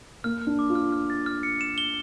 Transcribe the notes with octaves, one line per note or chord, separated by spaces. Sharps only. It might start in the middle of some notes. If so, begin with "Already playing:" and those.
A#3 F6
F6
D4
D6
F4
F6
F6
A6
F6
C#7
E7
G7